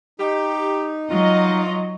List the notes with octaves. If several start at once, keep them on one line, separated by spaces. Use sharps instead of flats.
D#4 G4
F#3 F4 D#5